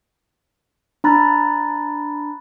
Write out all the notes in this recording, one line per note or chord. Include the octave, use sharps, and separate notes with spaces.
D4 A#5 B5 F#6 A6